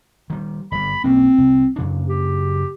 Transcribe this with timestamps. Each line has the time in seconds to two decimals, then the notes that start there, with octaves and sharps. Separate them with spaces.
0.30 D#3 G3
0.72 G1 G3 B5
1.04 B1 A#3 C4 C#4
1.38 C2
1.76 F#2 C#3 D4
2.08 G4